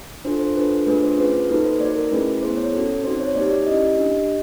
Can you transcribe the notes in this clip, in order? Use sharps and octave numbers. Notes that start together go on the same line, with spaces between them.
D4 F4 A4 C5
C5
D4 F4 A4 B4
A3 D4 F4 G#4 B4
C5
C#4 F4 G#4 B4
A#3 D#4 F#4 A4 B4
C5
A#3 D#4 F#4 D5
A#4
A3 C#4 E4 G#4 B4
B3 E4 G#4 C5
C#5
C#4 F#4 A4
C4 D#4 F#4 C5
C#5
A#3 D#4 G4 D5
D5
C#4 E4 G4 D#5
D4 G4